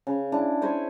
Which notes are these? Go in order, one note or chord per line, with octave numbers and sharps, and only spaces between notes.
C#3
D4 E4
C5 C#5 G#5 B5